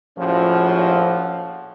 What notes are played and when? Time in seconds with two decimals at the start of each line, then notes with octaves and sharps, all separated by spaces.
0.18 A#1 A2 F3 C#4 F4 F#4